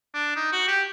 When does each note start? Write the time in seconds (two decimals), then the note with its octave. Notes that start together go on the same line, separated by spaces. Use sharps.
0.14 D4
0.36 D#4
0.52 F#4
0.68 G4